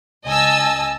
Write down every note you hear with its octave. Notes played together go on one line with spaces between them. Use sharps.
C#2 D#5 G#5 A5 E6